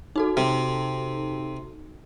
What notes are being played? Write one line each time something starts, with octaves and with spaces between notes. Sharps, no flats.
D#4 F#4 A4
C3